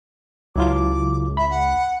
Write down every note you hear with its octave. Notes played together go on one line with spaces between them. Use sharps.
C#2 F#3 E4 F4 D6
E5 B5
F#5